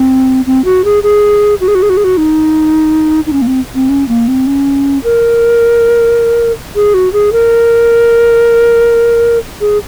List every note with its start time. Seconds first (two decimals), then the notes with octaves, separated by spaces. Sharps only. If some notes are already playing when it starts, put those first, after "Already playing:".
Already playing: C4
0.46 C4
0.65 F#4
0.84 G#4
1.03 G#4
1.61 F#4
1.68 G#4
1.75 F#4
1.82 G#4
1.90 F#4
1.97 G#4
2.04 F#4
2.17 D#4
3.26 D#4
3.33 C#4
3.42 A#3
3.47 C4
3.75 C4
3.89 C#4
4.08 A#3
4.28 C4
4.47 C#4
5.04 A#4
6.76 G#4
6.94 F#4
7.13 G#4
7.33 A#4
9.61 G#4